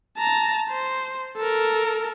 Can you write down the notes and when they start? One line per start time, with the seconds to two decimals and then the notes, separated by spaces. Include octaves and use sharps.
0.18 A5 A#5
0.70 C5
1.37 A4 A#4